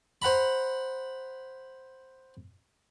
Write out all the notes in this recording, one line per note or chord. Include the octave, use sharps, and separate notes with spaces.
C5 F#5 A#5 B5